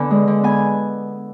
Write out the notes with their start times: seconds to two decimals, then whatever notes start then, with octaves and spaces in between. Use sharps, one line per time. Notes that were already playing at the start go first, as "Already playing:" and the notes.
Already playing: D3 B3 D5 G#5
0.11 G#3
0.27 D3
0.43 B3 G#5